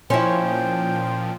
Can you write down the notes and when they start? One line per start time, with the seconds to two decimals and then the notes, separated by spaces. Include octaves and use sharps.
0.10 A#2 F3 C#4 E4 C5 G5